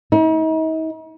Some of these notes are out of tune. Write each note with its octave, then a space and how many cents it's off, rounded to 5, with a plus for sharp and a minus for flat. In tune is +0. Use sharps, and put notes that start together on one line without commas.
D#4 +40